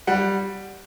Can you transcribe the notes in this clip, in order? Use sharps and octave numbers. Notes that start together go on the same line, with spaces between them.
G3 F#5